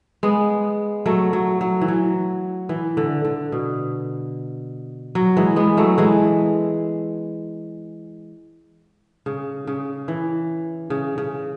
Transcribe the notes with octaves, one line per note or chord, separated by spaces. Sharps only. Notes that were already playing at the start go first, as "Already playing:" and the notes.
G#3 B3
F#3 A3
F#3
F#3
E3
F#3
E3
D3
D3
B2
F#3
E3 G#3
G#3 B3
F#3 A3
E3 G#3
C#3
C#3
E3
C#3
C#3